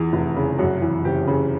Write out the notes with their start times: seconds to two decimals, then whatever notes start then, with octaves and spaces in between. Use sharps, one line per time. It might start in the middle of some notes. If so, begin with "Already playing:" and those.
Already playing: E2 E3 G#4
0.13 F1
0.36 C#3
0.59 F#2 F#4
0.82 E3
1.05 F#1 G4
1.27 C#3